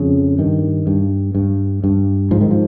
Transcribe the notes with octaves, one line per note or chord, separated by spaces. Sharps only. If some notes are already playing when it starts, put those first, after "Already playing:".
Already playing: F2 C#3
G2 D#3
G2
G2
G2
G#2 F3
D#3
F3